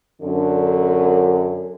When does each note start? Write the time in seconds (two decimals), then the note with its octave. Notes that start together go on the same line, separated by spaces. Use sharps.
0.22 F#2 D3